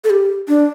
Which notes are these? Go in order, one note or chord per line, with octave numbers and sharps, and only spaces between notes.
A4
G4
D4